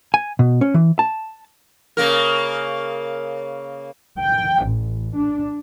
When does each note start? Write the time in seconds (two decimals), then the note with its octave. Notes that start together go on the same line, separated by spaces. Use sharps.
0.14 G#5
0.39 B2
0.61 C#4
0.74 E3
0.99 A5
1.97 C#3 A#3 A#4
4.19 G5
4.65 A1
5.15 D4